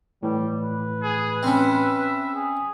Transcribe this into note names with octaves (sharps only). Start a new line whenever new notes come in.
A2 E3 G3
B4
G#4
C4 C#4 E5
G#4